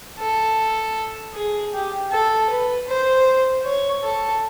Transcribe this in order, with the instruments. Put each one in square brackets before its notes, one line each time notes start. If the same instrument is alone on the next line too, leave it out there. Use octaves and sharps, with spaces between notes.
[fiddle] A4
G#4
G4
A4
B4
C5
C#5
A4